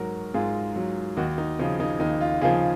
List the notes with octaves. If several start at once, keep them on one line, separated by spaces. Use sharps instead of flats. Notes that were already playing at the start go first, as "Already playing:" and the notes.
Already playing: G#2 F#3 F#4 A#4
G#2 F4 G#4
F#3
D#2 D#4 F#4
D#4
C#3 F3 D#4
D#4
D#2 D#4
F4
C#3 F3 F4 G#4